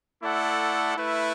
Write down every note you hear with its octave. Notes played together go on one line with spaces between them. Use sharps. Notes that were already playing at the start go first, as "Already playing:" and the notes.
A3 E4 A4 D5 F#5
A3 E4 B4 E5